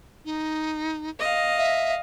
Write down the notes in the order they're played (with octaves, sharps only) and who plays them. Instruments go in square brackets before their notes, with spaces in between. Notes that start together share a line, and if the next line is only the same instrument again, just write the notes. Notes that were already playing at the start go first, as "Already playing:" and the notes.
[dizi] D#4
[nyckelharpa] D#5 F5
[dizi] E5